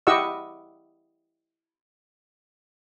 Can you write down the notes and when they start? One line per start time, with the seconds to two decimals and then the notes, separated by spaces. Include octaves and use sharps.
0.07 E4 G4 D#5 F#5 C#6 E6